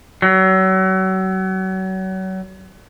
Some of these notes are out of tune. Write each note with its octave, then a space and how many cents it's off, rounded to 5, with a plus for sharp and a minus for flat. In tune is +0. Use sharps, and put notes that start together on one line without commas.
F#3 +35